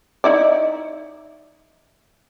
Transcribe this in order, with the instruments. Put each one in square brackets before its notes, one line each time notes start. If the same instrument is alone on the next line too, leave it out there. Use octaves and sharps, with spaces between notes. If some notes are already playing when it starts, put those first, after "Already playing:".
[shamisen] D#4 E4 D5